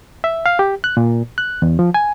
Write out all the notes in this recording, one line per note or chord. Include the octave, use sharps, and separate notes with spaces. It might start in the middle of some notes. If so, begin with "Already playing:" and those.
E5
F5
G4
F#6
A#2
F#6
E2
F3
G#5